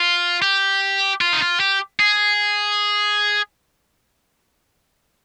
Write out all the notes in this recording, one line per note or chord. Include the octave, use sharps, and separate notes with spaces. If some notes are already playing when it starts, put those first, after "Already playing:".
Already playing: F4
G4
F4
D#4
F4
G4
G#4